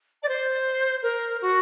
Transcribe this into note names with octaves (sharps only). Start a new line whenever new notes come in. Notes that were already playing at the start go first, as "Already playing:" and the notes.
D5
C5
A#4
F#4